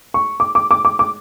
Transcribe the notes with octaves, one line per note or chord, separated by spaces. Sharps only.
C#6
D6
D6
D6
D6
D6